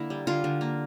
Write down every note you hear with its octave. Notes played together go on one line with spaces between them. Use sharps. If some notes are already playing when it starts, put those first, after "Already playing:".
Already playing: D3 A#3 E4
G3
D3 F4
D3
A#3